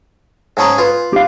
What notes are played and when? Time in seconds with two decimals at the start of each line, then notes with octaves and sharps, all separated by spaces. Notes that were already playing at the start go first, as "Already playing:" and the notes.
0.57 G#2 C#4 G#4 A5 A#5
0.78 F4 B4
1.13 G4 F5